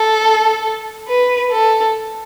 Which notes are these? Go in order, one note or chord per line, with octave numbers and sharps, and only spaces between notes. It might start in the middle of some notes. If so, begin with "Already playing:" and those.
Already playing: A4
B4
A4